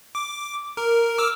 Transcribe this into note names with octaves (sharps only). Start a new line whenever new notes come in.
D6
A#4
D6 E6 F6